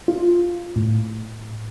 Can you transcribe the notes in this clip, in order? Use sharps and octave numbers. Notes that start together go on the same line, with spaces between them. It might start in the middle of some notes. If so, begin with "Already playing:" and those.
F4
A2